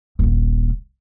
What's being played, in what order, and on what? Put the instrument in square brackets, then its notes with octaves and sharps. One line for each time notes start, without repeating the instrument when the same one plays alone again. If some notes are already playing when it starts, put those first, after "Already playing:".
[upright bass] D#1 A#1